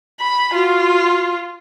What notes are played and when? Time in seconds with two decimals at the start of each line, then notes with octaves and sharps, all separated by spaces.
0.20 B5
0.55 F4 F#4